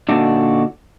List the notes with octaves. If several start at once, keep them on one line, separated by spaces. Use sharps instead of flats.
A#2 D3 D4 D#4 F#4